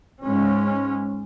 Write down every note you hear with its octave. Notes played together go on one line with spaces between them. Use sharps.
G#2 G#3 C#4